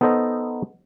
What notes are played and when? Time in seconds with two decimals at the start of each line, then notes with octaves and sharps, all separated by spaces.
0.01 B3 D#4 A4 C5 D#5